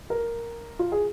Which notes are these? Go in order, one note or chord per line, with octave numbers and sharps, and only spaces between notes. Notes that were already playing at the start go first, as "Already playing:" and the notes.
A#4
F4
G#4